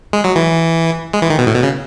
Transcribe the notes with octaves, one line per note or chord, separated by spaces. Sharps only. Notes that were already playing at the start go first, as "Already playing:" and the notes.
G#3
F#3
E3
G#3
E3
D#3
B2
A2
B2
C#3